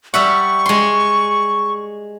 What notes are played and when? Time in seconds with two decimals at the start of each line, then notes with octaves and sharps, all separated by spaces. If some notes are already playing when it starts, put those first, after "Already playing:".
0.14 G3 E5 F#5 C#6
0.66 G#3 C6